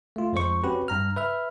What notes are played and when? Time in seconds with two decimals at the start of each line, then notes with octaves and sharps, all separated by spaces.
0.16 A3 F4
0.33 F2 F3 G#3 C5 C#6
0.64 C4 C#4 F#4 G4 B4
0.88 G2 A#5 F6
1.16 B4 E5 F6